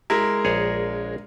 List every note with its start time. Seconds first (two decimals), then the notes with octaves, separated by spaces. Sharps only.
0.10 G#3 E4 A#4
0.45 A#1 G#4 C#5